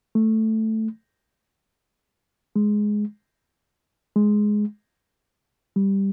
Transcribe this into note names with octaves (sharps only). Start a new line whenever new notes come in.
A3
G#3
G#3
G3